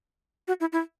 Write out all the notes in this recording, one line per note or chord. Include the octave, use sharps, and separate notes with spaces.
F#4
E4
E4